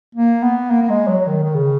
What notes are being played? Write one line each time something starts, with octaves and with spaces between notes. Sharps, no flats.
A#3
B3
A#3
A#3
G#3
F#3
D#3
D#3
C#3